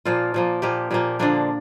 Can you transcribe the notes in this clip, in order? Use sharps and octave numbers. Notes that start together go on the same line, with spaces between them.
A#2 F3 A#3 F4
A#2 F3 A#3
A#2 F3 A#3 G4
A#2 F3 A#3 G4
D3 F3 A#3 D4